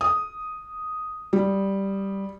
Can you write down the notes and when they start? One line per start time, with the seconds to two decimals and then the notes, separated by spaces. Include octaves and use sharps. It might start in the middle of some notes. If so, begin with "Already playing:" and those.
0.01 D#6
1.33 G3